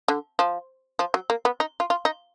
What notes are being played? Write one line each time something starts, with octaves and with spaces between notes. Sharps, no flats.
D3
F3
F3
F#3
A#3
B3
D#4
F4
F4
D#4